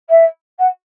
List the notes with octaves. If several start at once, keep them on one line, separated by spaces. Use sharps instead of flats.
E5
F#5